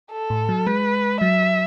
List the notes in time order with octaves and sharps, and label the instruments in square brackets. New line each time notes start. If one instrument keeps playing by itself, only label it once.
[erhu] A4
[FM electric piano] A2
F#3
[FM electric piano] G#3 [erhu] B4
[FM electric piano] F#3 [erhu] E5